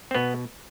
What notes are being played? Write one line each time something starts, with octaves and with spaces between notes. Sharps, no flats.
C4
B2 B3